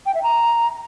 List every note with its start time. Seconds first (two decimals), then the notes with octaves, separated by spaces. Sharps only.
0.06 G5
0.15 E5
0.23 A#5